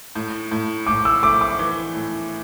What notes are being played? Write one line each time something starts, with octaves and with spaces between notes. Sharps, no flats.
A2
A2
A2 D6
E6
A3 D6
D6
E3
A2